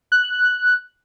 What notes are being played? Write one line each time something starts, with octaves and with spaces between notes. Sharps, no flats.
F#6